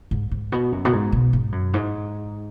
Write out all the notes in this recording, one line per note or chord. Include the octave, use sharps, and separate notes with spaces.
G#2
G#2
B2
F#2
B2
G#2
B2
G#2
F#2
G#2